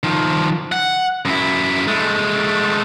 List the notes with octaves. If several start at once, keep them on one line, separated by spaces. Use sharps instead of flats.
D#3 F3
F#5
F#2 E4
G#3 A3